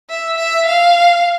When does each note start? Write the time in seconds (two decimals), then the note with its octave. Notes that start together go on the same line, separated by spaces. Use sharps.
0.10 E5
0.38 E5
0.66 F5